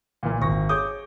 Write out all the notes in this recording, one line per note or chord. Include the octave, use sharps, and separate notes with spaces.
A#2 E3 A#3
G#1 C#6 A#6
G#4 C#5 D6 D#6 G6